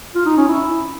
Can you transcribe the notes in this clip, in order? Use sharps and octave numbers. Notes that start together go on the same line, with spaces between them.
F4
D#4
C#4
E4